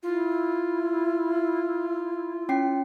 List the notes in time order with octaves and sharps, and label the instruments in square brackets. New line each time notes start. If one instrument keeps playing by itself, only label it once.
[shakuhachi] E4 [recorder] F4
[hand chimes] C#4 G5 C7